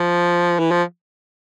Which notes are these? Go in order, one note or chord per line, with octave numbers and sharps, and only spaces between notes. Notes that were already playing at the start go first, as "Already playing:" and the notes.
Already playing: F3
E3
F3